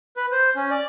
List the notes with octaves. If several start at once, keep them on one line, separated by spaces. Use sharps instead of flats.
B4
C5
C#4
D5